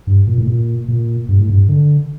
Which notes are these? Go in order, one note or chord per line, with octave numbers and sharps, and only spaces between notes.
G2
A#2
A2
A#2
A#2
G2
A2
G2
D3